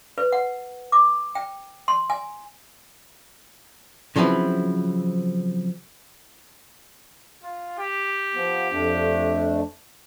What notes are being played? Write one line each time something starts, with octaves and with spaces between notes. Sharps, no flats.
B4
F#5
D6
G5
C6
G#5
C#3 F3 F#3 C4 E4 B4
F4
G4
F3 B3
F2 A3 D4